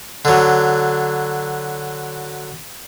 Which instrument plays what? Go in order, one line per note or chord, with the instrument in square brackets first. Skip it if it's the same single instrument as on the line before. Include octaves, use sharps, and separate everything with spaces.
[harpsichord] D3 F#3